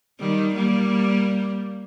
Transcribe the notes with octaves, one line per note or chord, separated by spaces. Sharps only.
D#3 G3
G3 A#3